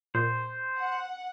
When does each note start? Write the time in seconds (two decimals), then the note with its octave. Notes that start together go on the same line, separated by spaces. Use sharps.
0.15 A#2 C5
0.78 F#5